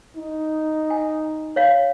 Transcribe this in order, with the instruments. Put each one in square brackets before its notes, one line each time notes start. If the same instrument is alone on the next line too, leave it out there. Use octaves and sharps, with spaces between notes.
[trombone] D#4
[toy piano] G#5
C#5 F5